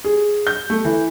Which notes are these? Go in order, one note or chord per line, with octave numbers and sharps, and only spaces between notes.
G#4
G6
A3
E3